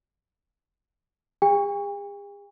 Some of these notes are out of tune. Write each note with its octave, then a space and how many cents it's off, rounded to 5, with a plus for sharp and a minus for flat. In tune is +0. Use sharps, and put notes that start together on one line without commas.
G#4 -45 G5 +45